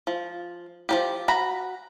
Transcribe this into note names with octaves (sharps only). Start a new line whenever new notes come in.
F3
F3 F#3 G4
F#4 A#5 B5